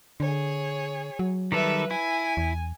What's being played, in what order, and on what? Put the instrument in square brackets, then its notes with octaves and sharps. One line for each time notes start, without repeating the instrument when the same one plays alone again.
[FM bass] D3 [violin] G#4 C#5
[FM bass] F#3
[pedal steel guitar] D#3 G3 A4 [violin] B4 E5
[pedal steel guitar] E4 [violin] G#5
[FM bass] E2